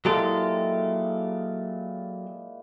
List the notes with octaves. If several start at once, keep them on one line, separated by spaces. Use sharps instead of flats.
A#2 F#3 G#3 E4 G4 A4